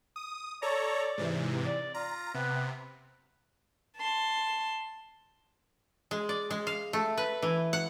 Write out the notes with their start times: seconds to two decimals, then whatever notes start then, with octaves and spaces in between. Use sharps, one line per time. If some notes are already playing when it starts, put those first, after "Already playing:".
0.16 D#6
0.62 A4 C#5 D5 A#5
1.18 G#2 C3 E3
1.65 D5
1.94 F4 A#5
2.34 C3 B3
3.97 A5 C6
6.11 G#3
6.29 D5
6.50 G#3
6.67 F5
6.93 A3
7.17 B4
7.42 E3
7.73 F#5